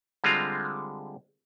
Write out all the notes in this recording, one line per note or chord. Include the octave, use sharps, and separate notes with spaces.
D3 G3 G#3 C4 F4 A#5